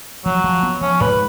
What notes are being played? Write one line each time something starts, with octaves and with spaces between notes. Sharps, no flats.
F3 F#3
F3
B3
F3 C#4
G#2 B4